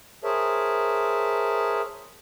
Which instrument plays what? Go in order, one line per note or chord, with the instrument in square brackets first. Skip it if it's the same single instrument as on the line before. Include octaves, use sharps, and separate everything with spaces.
[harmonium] G#4 A#4 C5 C#5 E5 A5